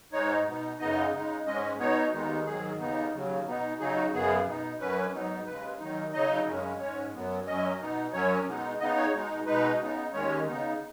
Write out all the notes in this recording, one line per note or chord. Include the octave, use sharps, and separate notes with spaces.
G#2 G#3 D#4 C#5
B2 B3 D#4
F#2 C#3 B3 D#4 D#5
C#3 G#3 D#4
G#2 G#3 C#4 D#5
B2 B3 D#4 C#5
D#2 D#3 G#3 B3 D#4
G#2 D#3 F#3 G#4
D#2 C#3 B3 D#4
D#2 C#3 F#3
B2 B3 D#4
C#3 F#3 D#4 G#4
F#4
F#2 C#3 B3 G#4
B2 B3 D#4
F#2 F#3 C#4 B4
G#2 F#3 B3 D#4
D#2 C#3 G#3 B4
D#2 D#3 F#3 D#4
C#3 F#3 D#4 D#5
F#2 C#3 G#3 C#4
G#2 G#3 C#4 C#5
F#2 F#3 B3
F#2 F#3 C#4 D#5
B2 B3 D#4
F#2 F#3 C#4 C#5
B2 G#3 B3 D#4
C#3 B3 D#4 D#5
C#5
B2 G#3 D#4
B2 G#3 D#4 B4
C#3 B3 D#4
D#2 D#3 G#3 C#4 C#5
C#3 B3 D#4